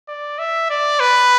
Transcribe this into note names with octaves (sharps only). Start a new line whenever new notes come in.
D5
E5
D5
B4